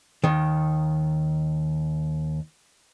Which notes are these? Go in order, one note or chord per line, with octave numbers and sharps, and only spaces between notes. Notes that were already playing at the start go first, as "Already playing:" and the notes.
D#2 D#3